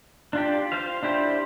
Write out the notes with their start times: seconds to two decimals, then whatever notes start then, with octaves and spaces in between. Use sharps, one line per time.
0.33 D4 F4 G4
0.72 F4 C5 F5
1.03 D4 E4 G4 C5